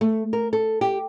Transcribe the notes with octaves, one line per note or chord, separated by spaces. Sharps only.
A3
A#4
A4
G4